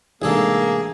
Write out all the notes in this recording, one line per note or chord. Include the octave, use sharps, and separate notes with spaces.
A1 C3 G#3 A#3 D4 D#4 G#4 A4